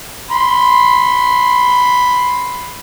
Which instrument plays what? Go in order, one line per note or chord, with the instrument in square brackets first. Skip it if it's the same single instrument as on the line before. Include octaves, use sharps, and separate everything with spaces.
[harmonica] B5 C6